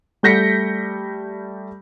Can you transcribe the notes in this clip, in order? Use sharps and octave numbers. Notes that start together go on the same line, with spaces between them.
G3 A3 G6 A#6 B6 C#7